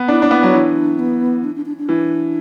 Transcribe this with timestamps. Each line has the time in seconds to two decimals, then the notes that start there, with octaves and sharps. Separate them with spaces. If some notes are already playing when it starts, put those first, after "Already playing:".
Already playing: B3
0.08 D4 E4
0.22 D4
0.31 B3
0.43 F#3
0.54 E3 D4
0.99 B3
1.44 D4
1.55 D4
1.66 D4
1.77 D4
1.89 E3